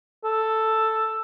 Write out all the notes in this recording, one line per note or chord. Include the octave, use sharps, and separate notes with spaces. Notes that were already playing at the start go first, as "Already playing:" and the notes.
A4